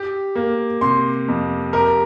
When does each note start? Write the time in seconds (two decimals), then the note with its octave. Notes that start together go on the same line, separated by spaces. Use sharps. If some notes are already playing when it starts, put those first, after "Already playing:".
Already playing: G4
0.35 A#3
0.81 C3 C6
1.28 F2
1.73 G4 A#4